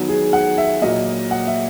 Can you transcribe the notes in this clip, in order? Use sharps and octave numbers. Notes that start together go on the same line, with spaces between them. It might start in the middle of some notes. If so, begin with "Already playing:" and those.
Already playing: D#3 F#3 B3
G#4
F#5
E5
A#2 F#3 A#3 D#5
F#5
E5